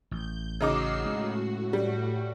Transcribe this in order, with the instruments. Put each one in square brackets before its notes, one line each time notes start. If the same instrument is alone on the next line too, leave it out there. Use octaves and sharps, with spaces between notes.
[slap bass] A1 [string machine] G6
[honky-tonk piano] C#3 D#4 D6 [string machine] F#4 E6 C7
[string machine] A2 F#4 [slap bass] G#3 C#4
[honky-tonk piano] G3